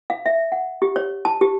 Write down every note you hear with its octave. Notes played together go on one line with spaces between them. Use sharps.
F5
E5
F#5
G4
C#5
A5
G4